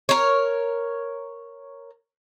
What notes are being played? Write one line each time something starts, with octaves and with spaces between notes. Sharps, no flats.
A#4 C#5